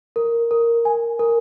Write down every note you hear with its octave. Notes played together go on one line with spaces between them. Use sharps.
A#4
A#4
G#5
A#4